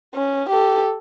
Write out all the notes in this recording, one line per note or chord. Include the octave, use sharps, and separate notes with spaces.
C#4
G4 A4